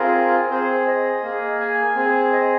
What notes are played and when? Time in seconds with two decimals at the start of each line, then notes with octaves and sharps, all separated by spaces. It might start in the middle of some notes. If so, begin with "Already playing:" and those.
Already playing: C4 F4 G#4 A#4
0.50 C4 G#4 C5
0.87 D#5
1.23 A#3 G#4
1.60 G#5
1.96 C4 G#4
2.32 D#5